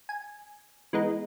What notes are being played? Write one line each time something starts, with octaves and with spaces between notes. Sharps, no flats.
G#5
E3 G#3 B3 D#4